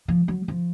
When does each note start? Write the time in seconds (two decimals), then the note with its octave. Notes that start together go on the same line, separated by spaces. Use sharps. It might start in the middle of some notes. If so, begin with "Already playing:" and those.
0.08 F3
0.28 F#3
0.48 F3